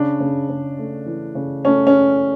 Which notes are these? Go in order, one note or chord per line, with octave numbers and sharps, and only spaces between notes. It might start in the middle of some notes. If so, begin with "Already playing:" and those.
Already playing: C#3 D4
C#3
C#3
A3
E3
C#3
A3 C#4
C#4